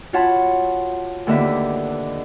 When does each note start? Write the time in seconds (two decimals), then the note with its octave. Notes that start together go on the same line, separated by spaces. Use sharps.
0.13 F4 F#4 C#5 F#5 A5 B5
1.27 D#2 D3 A#3 B3 E5